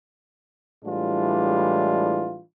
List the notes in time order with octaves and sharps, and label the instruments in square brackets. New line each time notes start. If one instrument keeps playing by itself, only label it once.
[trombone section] A2 E3 G3 G#3 D4 F4